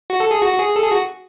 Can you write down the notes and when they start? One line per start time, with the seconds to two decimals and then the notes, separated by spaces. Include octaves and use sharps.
0.10 F#4
0.20 A4
0.31 G#4
0.42 F#4
0.54 F#4
0.59 G#4
0.76 A4
0.84 G#4
0.91 F#4